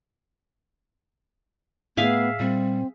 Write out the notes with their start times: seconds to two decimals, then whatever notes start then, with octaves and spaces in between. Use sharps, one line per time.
1.97 A2 A3 B3 G#4 E5 F5
2.40 A#2 G3 C4